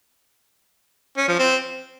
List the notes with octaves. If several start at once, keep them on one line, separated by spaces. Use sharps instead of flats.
C#4
F3
C4